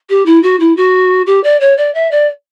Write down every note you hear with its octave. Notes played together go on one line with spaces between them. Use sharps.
G4
E4
F#4
E4
F#4
G4
D5
C#5
D5
E5
D5